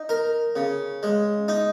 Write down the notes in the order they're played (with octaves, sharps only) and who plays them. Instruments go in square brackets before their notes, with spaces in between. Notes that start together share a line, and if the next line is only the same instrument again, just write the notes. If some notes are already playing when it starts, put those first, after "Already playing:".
Already playing: [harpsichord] D#4
A#4
C#3
G#3
D#4